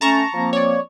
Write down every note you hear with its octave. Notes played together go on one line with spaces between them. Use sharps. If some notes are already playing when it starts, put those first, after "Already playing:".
A3 C#4 A5 A#5 C#6
F3 A#3 C4
C#5 D5